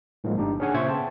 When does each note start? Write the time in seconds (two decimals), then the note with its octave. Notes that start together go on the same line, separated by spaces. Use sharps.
0.24 A2 D#3 F3 F#3 G#3 A#3
0.37 G1 D4 D#4 G4
0.60 C#4 D4 G#4 C#5 F#5 G#5
0.74 A#2 C#3 C5 E5 C#6 G#6
0.89 B3 G5 A5